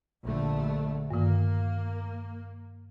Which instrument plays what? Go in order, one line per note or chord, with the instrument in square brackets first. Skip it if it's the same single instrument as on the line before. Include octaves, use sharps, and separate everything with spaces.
[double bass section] A#1 D3 A3
[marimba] G2 D#3 [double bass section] A#3